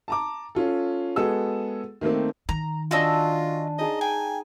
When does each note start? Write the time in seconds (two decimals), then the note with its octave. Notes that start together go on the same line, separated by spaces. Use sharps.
0.08 A5 A#5 D6
0.55 C#4 F4 A4
1.16 G#3 B3 F#4 G#4 A4 E6
2.01 D#3 A3 A#3 C4
2.49 D#3 A#5
2.91 D4 F4 F#4 D#5 G#5 E6
3.79 D#4 G#4 D#5 A5
4.01 G5 G#5